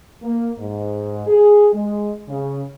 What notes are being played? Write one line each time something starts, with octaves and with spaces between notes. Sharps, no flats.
A#3
G#2
G#4
G#3
C#3